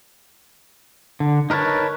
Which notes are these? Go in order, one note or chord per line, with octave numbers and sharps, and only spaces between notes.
D3
D#4 A#4 B4 C#5 A5